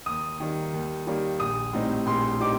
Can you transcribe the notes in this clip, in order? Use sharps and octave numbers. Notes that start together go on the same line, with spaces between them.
D#2 D#6
D#3 G3 A#3
D#2
D#3 G3 A#3
A#1 D#6
A2 G3 C4 D#4
A#1 C6
A2 G3 C4 D#4 D6